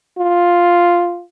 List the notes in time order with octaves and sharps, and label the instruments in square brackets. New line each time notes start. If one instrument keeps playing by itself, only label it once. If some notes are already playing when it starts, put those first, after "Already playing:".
[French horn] F4